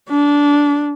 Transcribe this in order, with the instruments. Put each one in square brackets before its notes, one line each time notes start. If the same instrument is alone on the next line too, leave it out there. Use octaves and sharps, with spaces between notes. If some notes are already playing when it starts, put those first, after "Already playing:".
[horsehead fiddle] D4